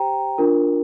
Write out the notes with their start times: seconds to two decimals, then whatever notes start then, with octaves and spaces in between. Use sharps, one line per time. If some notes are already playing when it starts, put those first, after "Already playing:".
Already playing: G4 C5 G5 A#5
0.38 D4 F4 A#4